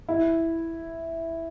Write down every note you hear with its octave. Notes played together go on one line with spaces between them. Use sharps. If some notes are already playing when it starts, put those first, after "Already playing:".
E4